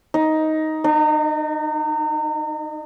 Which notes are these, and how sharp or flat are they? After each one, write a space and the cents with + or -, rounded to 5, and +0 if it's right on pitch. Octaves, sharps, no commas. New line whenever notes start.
D#4 +10
D#4 -35